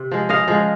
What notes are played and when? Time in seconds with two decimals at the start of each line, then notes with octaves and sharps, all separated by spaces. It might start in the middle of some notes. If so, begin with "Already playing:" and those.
Already playing: C3
0.12 F3 G#3
0.29 C#3 D#5 F5
0.48 F3 G#3